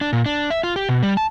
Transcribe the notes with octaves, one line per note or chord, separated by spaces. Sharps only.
D4
A#2
D4
E5
F4
G4
B2
G3
A5